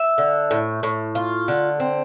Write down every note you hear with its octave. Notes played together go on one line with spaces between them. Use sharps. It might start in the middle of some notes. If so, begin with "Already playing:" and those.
Already playing: E5
D3
A2
A2
F4
D3
C4